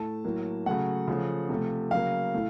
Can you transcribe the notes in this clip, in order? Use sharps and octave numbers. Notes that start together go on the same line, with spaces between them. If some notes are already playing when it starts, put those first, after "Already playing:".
Already playing: A2 A3 A5
A2 F#3 A#3
C#3 F#3 A3 F#5
C#3 F3 A3
C3 F3 A3
C#3 F#3 A#3 F5
A2 A3